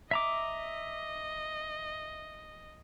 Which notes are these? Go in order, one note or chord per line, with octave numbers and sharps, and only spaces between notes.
D#5 E5 A#5 D6